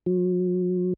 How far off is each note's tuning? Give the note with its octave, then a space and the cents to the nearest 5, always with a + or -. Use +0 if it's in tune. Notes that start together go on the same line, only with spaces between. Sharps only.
F#3 -40